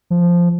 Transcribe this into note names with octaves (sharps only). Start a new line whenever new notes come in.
F3